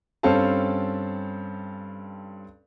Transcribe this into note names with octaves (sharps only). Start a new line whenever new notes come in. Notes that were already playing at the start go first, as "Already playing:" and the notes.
G2 C4 C#4 A4 F5 A5